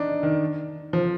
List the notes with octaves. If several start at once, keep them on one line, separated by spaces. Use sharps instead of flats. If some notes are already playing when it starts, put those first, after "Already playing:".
Already playing: D4 D#4
D#3
F3